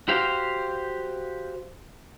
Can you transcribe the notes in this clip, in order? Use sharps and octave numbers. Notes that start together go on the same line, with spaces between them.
F#4 G4 C5 F5